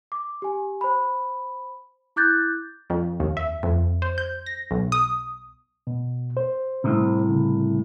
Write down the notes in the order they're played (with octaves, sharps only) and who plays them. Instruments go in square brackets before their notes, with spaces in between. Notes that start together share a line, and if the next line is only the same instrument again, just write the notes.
[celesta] D6
G4 G#5
C5 B5
E4 D6 F#6 G6 A6
[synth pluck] F2
D#2
E5
F2
C5
G6
A#6
B1
D#6
[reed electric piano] B2
C5
[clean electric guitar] C2 A2 C3
[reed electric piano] C#3